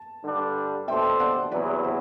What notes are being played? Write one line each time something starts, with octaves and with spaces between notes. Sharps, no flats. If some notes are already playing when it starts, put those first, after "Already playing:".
Already playing: A5
G2 D3 G3 D4
B2 A3 D4 A4 C5 E5 G5
D5 F#5
E2 C3 F#3 B3 E4 B4 D5
C5